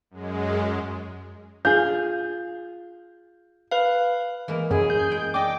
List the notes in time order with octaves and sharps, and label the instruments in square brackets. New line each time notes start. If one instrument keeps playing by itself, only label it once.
[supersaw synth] F#2 G#3
[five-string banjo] F4 G#4 [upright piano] G6
[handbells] B4 F5
[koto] E3 G#3 A#3
[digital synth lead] F#2 [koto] G#3 E4 [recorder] G#4
[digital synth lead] G6
[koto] G#3 G5
[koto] D4 D#5 [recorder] G5 [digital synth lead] D6